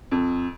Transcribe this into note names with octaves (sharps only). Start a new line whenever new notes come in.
F2